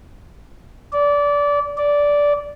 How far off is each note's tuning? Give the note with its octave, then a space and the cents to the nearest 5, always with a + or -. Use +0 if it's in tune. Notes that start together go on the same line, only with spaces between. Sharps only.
D5 -20
D5 -10